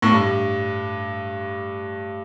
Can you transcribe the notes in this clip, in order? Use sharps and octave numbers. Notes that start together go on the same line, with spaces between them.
A2
G2